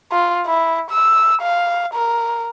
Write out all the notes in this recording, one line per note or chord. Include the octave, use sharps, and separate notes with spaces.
F4
E4
E6
F5
A#4